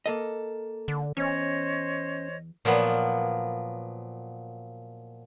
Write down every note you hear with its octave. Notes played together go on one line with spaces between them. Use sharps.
A#3 A4 D#5
D3
E2 C#4 C5 C#5 D#5
A#2 F3 F#3 B3